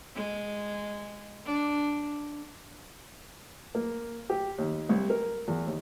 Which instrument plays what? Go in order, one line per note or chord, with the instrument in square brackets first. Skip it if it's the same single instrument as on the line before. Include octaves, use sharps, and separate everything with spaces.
[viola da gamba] G#3
D4
[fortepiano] A#3
G4
D#2
C2
A#4
E2
D#2